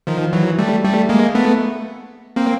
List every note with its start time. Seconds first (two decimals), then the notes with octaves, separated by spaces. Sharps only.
0.07 D#3 F3
0.33 E3 F#3
0.59 G3 A3
0.83 G3 A3
1.09 G#3 A#3
1.35 A3 B3
2.36 A#3 C4